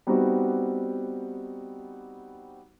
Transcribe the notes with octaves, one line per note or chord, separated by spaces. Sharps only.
G3 B3 C4 D#4 F#4 G4